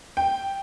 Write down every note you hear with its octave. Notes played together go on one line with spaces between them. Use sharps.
G5